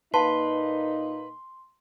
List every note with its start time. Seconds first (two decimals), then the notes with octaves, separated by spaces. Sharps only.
0.14 A#2 A#3 D#4 B4 F5 A5 C6